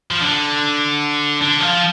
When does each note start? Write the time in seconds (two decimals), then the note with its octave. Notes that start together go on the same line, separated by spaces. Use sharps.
0.11 F3
0.22 D3
1.41 D3
1.60 F3